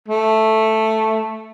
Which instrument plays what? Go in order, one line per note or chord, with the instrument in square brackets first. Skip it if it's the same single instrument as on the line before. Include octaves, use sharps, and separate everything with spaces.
[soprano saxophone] A3